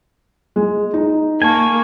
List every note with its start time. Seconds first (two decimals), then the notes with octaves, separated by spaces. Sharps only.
0.56 G#3
0.94 D#4
1.42 A#3 G#5 A5 C#6